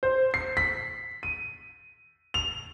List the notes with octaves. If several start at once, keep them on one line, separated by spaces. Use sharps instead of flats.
C5
C7
B6
D#7
F7